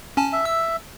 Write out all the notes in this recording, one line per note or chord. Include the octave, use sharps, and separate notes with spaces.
C#4 G#5 A5
E5
E6